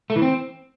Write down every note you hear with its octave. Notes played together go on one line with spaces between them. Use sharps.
A3
E3
C4